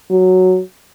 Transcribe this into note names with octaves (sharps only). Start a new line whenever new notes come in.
F#3